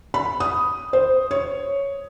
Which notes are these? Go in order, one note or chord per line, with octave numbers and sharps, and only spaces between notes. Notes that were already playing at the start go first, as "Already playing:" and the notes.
B5
D#6
C5
C#5